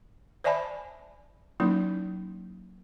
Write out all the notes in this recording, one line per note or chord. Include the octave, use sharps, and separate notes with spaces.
C5 D5 E5 G#5 A5 B5
F#3 A#3 C#4 D#4 E4